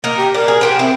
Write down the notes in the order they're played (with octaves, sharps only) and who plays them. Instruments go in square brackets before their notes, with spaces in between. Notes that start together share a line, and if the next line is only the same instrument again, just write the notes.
[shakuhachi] A#3 [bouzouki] D#4 A#4
[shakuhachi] G4
[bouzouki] D4 [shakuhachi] A#4
[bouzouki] G#4
B3 G4 C5
[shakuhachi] C4 [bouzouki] E4